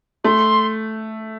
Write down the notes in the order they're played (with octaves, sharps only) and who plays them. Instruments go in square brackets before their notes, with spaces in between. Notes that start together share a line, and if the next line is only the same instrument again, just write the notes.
[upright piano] A3 [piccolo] C6